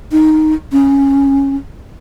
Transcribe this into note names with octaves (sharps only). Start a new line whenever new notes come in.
D#4
C#4